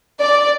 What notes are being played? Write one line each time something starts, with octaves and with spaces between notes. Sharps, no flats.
D5